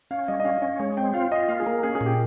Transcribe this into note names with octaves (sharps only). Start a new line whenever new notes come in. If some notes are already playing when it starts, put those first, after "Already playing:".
C#4 F5
G3 D#5
D#5
C#4 F5
C#4 D#5
G#3 C#5
C4 G5
F4 F5
F4 D#5
A#3 F5
G#4
A#3 A#4
C#4 G#4
G#4
A#2
G4